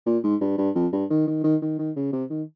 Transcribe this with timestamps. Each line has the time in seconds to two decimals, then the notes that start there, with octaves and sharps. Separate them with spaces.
0.06 A#2
0.24 G#2
0.41 G2
0.58 G2
0.75 F2
0.93 G2
1.10 D#3
1.27 D#3
1.44 D#3
1.62 D#3
1.79 D#3
1.96 C#3
2.13 C3
2.30 D#3